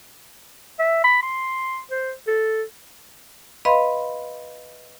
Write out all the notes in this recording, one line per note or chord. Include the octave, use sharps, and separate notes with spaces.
E5
B5
C6
C5
A4
B4 D#5 F5 B5 C6